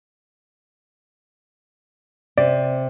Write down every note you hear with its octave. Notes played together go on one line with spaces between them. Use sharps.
C3 D5